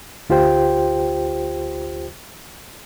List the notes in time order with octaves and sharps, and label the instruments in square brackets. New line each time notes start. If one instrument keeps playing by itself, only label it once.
[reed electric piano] D2 F4 G4 C5 G5